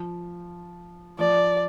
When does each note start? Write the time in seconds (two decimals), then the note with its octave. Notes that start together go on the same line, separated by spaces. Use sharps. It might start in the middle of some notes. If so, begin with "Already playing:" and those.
Already playing: F3
1.18 F3 D5